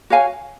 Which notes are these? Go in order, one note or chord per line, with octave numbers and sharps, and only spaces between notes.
F#4 C#5 F5 G#5